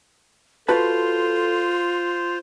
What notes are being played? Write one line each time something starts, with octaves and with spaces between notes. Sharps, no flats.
F4 F#4 A4 B4 C5 A5